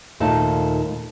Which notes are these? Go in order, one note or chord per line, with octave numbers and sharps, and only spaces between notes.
D#2 A#2 A3 D#4 A5